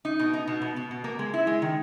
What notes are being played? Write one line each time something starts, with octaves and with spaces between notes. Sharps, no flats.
D#4
B2
D#4
B2
B2
B2
B2
A#3
G#3
E4
G#3
D#3